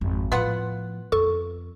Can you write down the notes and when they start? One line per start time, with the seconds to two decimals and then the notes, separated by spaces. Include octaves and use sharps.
0.01 G#1 F2
0.32 A2 F3 B3 F4 F#5
1.12 F2 A4 C#6